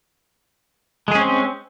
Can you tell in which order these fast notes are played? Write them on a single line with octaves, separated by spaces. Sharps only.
G#3 G#4 C#4 C4